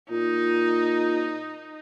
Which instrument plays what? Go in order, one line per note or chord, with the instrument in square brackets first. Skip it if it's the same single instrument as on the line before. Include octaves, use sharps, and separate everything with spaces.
[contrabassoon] A#2 [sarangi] D#4